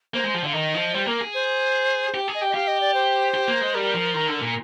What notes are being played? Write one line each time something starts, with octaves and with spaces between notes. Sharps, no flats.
A#3 C5
G#3
F3
D3 F5
D#3 D#5
F3
G3 C5
A#3 A#4
G#4
C5
G4
G#4
D#5
G4
D#5
G4 F5
D#5
D5
C5
G4
A#3
G#3
G3 A#4
F3
D#3
D3
A#2